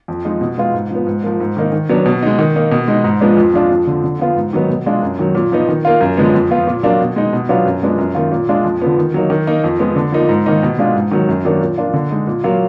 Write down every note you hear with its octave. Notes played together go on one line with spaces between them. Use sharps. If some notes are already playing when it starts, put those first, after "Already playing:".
F2
F3 G#3 D#4
B2
G#3 B3 F4
G#2
F3 B3
G#2
F3 A#3
G#2
D#3 A#3 D#4
D#3
F#3 B3 D4
B2
G#3 D#4
D#3
A#3 D#4
B2
G#3 D#4
G#2
F3 G#3 B3 D4
F2
F3 G#3 D4 F4
F2
D3 F3
D3
F3 B3 F4
G#2
D#3 F#3 B3 D#4
B2
G#3 D4 F4
F#2
D#3 F#3
A#2
F3 B3 D#4
D#3
A#3 F4
F#2
D3 F3 G#3 B3
F2
F3 B3 F4
A#2
F#3 A#3 D4 F4
B2
G#3 D#4
B2
F#3 B3 D4 F4
F#2
F3 G#3 B3 D4
F#2
D#3 A#3 F4
A#2
G#3 D4 F4
F2
D3 F3 B3
D#3
F#3 A#3 D#4
D#3
A#3 D#4
F2
F3 G#3 B3
D3
F3 A#3 D#4
G#2
D#3 A#3 D#4
B2
G#3 D4 F4
G#2
D#3 F#3
F#2
D#3 F#3 A#3 D4
A#2
F3 A#3 D4 F4
D3
G#3 D#4
A#2
F#3 A#3 F4